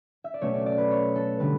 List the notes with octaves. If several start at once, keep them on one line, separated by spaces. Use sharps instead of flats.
E5
D5
B2 F#3 A3 C#4 C#5
D5
D5
B4
C#5
A4
D3 G3 B4